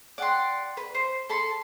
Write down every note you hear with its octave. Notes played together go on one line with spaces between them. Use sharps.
D5 F#5 G5 C6
B4
C5
A4 A5 B5 C6